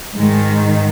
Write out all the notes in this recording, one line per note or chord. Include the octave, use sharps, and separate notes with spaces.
G#2 D#3 G#3